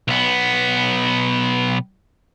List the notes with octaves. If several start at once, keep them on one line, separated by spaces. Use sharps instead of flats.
B1 B3